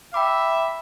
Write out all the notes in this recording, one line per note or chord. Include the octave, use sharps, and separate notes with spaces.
E5 G5 B5 D6